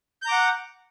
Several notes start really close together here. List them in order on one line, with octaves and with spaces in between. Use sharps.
G6 A#5 D6 F#5